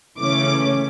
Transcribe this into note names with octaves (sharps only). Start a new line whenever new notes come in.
C#3 E3 A3 C#4 D6